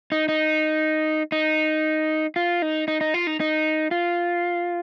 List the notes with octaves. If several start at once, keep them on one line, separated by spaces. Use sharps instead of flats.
D#4
D#4
D#4
F4
D#4
D#4
D#4
F4
D#4
D#4
F4